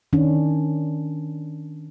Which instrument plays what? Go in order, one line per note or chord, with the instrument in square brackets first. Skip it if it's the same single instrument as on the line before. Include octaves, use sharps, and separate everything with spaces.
[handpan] D#3 C#4 D4